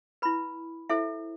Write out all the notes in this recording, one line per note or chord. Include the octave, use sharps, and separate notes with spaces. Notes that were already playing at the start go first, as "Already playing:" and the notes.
E4 B4 B5
E4 A4 C5 E5